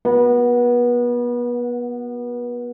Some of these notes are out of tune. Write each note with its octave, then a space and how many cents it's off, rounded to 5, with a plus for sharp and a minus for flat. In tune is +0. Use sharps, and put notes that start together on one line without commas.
B3 -30 F#4 +0